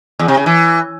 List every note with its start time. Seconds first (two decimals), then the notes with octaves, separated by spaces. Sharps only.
0.19 E2
0.28 C3
0.37 C#3
0.46 E3